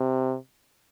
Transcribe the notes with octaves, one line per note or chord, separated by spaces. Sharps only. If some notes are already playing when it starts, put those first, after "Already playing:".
Already playing: C3